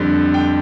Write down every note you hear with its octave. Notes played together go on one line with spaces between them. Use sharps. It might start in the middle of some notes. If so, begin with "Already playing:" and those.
Already playing: F2 D3 G3
G5